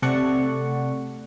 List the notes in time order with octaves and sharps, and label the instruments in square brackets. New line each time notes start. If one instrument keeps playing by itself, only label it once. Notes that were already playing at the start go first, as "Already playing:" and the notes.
[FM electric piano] C3 A3 A4 D5 F#5 C#6